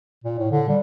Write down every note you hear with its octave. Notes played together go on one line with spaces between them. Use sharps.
A#2
A2
D3
G3